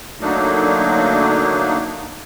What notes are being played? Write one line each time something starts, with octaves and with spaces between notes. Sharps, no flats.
D3 F#3 A3 A#3 D4 D#4